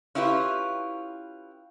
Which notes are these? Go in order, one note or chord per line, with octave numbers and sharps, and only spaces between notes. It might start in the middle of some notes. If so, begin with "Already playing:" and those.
C#4 E4 F4 G4 B4